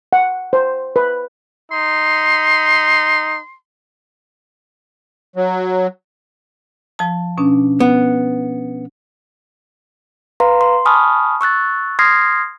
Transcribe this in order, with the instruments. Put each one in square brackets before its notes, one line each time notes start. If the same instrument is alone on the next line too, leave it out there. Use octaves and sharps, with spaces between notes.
[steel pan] F#5
C5
B4
[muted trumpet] D#4 [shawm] C6
[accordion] F#3
[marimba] F3 A5
B2 C#4 D4
[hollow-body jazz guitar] B3
[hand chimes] B4 F5 A#5 C6
C6
G#5 A5 B5 C#6 D#6 F6
C#6 E6 F#6 A6
C6 D#6 F6 G#6 A#6 C7